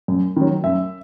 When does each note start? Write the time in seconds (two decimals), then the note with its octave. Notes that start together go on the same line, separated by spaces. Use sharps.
0.08 F#2
0.36 D#3 F#3
0.64 F#2 E5